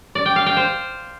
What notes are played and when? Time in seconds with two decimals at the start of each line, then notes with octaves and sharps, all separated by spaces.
0.15 D5
0.26 G5
0.36 F5
0.46 G5
0.57 C5